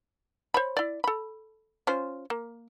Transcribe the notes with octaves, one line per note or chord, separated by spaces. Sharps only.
C5 C#5 B5
E4 D5
A4 B5
C#4 F4 C5
A#3